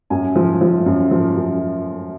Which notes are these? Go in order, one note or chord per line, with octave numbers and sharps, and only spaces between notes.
F#2 G#5
F3
F3
F#2
F3
F#2